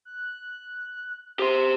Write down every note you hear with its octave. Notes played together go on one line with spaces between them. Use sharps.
F#6
G4 C5 C6